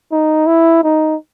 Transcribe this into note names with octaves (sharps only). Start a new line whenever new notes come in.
D#4
E4
D#4